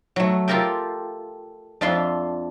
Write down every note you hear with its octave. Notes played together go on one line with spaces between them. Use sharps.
F#3 A3
F4 G4 A4 A#4 E5 G5
F2 D4 F4 E5 C6